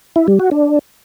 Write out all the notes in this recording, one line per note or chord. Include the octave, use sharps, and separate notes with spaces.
E4
G3
F#4
D4